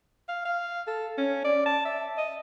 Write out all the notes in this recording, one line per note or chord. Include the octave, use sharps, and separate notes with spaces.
F5
F5
A4
C#4
D5
A5
E5
D#5